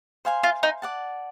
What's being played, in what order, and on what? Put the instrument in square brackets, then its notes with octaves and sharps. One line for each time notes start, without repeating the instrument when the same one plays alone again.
[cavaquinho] C5 F5 G#5 C6
[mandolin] F4
D#4
[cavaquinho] D5 F#5 A5